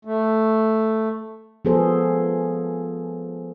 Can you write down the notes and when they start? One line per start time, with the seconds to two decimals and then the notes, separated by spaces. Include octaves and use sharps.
0.05 A3
1.65 F3 B3 G#4 A4 C5